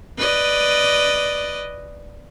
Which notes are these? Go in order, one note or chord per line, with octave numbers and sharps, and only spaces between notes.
B4 D5 D#5